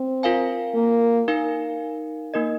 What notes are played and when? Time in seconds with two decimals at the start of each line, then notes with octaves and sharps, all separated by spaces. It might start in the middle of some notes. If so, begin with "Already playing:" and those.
Already playing: C4
0.23 F4 A#4 F5 G#5
0.75 A#3
1.28 D#4 A#4 F5 G#5
2.34 A#3 D#4 A#4 D#5